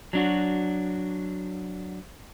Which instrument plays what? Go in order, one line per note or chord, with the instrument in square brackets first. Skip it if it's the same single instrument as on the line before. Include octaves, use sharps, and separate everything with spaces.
[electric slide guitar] F#3 D4 F#4